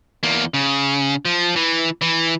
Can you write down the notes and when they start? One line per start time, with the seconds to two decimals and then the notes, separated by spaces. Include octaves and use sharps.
0.23 E2 A#3
0.54 C#3
1.25 F3
1.56 E3
2.02 E3